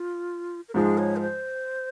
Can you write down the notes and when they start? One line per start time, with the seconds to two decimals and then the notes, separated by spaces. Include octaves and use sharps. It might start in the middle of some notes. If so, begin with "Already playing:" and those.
Already playing: F4
0.69 A#4
0.74 G#2 F3 G#3 G#4
0.98 C#5
1.16 A#4
1.21 C5